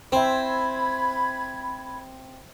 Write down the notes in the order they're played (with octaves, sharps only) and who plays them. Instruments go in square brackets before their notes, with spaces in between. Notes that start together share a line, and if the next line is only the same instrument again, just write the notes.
[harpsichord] C4 [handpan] C5 E5 [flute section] B5 G#6